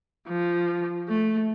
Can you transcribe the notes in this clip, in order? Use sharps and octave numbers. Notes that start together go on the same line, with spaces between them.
F3
A3